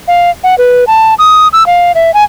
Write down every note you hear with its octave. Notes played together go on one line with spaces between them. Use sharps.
F5
F#5
B4
A5
D#6
E6
F5
E5
G#5